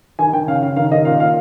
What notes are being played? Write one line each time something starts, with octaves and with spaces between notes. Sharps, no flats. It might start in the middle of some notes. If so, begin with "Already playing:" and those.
D#3 G#5
D#3 G5
C#3 F5
C#3 F5
D#3 F5
D#3 D#5
A#2 F5
A#2 F5